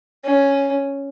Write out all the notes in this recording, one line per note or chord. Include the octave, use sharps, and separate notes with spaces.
C#4